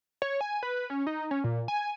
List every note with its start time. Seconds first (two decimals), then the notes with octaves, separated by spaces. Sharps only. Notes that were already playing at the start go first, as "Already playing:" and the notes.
0.22 C#5
0.41 G#5
0.63 B4
0.90 C#4
1.07 D#4
1.31 C#4
1.44 A#2
1.68 G#5